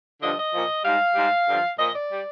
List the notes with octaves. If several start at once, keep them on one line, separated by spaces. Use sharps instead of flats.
G2 D3 F3 D#5
D#5
A#2 F3
G#2 G3 F5
G#2 G3
G2 D3 F3
A#2 F3 D#5
D5
G3